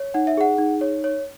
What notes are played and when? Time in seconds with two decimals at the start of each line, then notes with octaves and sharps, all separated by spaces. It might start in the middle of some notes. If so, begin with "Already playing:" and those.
Already playing: C#5
0.14 D#4 F#5
0.27 E5
0.37 G#4 F#5
0.58 D#4
0.81 C#5
1.04 C#5